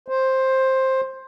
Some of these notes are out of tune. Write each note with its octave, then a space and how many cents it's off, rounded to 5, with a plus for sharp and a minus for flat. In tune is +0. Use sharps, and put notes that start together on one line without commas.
C5 +10